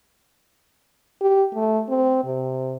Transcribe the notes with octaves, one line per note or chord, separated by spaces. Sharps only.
G4
A3
C4
C3